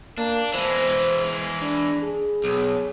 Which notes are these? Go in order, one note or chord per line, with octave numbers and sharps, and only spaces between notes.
A#3 D4
E3 G#3 C5
D4
G#4
B1